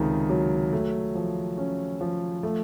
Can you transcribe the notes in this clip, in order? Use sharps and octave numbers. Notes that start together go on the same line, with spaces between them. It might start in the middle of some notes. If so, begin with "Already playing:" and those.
Already playing: C#2 C3 D#3
F#3
A3
F3
C#4
F3
A3